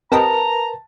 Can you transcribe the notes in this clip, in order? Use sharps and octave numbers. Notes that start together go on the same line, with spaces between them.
C4 G4 A#4 B4 D#5 A5 A#5